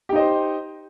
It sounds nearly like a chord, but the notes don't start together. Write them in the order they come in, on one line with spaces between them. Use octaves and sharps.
G4 D#4 D#5 C5